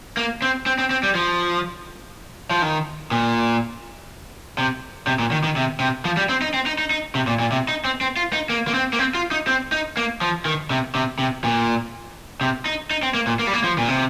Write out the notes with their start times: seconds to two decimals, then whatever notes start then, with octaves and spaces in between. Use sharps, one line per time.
0.17 A#3
0.42 C4
0.66 C4
0.78 C4
0.90 C4
1.03 G3
1.15 F3
2.50 F3
2.62 D#3
3.11 A#2
4.58 C3
5.07 C3
5.19 A#2
5.31 D#3
5.44 D#3
5.56 C3
5.80 C3
6.05 F3
6.17 G3
6.29 C4
6.42 D#4
6.54 C4
6.66 D#4
6.78 D#4
6.90 D#4
7.15 C3
7.27 A#2
7.39 A#2
7.52 C3
7.68 D#4
7.85 C4
8.01 C4
8.16 F4
8.33 D#4
8.50 A#3
8.67 A#3
8.74 C4
8.93 A#3
8.99 C4
9.14 F4
9.31 D#4
9.47 C4
9.72 D#4
9.97 A#3
10.21 F3
10.45 D#3
10.70 C3
10.95 C3
11.19 C3
11.44 A#2
12.41 C3
12.66 D#4
12.91 D#4
13.03 C4
13.14 A#3
13.27 A#2
13.39 A#3
13.47 G3
13.54 A#3
13.64 F3
13.78 A#2
13.88 C3